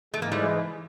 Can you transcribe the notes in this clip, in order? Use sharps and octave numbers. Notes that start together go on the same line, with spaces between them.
G#2 E3 G#3 A3
A#3
G3 A3